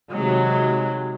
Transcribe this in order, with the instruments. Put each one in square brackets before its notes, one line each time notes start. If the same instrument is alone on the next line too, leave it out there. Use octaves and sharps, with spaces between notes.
[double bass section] C3 D#3 G#3 [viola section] F#3